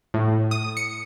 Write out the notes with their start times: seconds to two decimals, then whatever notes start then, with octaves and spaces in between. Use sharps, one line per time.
0.14 A2
0.51 D#6
0.77 C#7